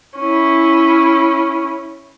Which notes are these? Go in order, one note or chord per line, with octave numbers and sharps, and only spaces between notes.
C#4 E4